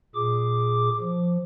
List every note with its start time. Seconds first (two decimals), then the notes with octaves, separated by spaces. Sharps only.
0.15 A#2 G#4 D6
1.01 F3